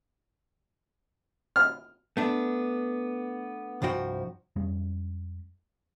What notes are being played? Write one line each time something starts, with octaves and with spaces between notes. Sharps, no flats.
F6
A3 B3 D4
C2 G2 F3 F#4 G5
F2 G3 G#3 C#4